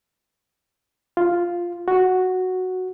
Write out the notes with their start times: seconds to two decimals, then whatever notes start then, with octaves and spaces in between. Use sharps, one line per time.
1.17 F4
1.88 F#4